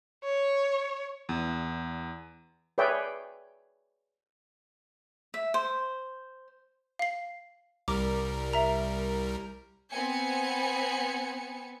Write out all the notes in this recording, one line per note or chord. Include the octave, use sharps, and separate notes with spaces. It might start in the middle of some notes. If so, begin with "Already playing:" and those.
C#5
E2
G#4 B4 C#5 D5 E5 G5
E5
C5
F5 C7
C2 G3 A#4 D6
E5 A#5
B3 C4 G#5 C#7